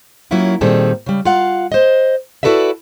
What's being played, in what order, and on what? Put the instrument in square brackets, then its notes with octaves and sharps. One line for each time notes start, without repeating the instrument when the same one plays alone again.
[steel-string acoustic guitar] F#3 A#3 C#4 E4 F4
A#2 D#3 G3 C4 G#4 A4
C#3 G3
F4 F5 F#5
C5 D#5
E4 F#4 A4 B4 D5 E5